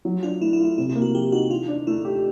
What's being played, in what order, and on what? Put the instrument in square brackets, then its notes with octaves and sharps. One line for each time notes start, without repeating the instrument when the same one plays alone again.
[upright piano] F#3
[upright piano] D4 [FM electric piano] F4
[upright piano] A3 [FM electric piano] E4
[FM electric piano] E4
[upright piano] F4
[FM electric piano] E4
[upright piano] C3 [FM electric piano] E4
[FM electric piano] E4
[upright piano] A#3
[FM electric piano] F#4
[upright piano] F3 [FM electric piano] G4
[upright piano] D#4 [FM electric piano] F#4
[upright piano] E3 [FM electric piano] F4
[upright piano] D4
[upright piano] A3 [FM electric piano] E4
[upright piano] G4